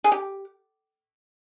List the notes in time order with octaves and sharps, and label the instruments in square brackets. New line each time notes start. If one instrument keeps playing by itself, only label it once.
[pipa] G#4
G4